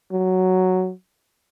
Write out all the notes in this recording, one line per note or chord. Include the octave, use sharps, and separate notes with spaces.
F#3